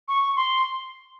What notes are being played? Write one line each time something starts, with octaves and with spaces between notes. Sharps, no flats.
C#6
C6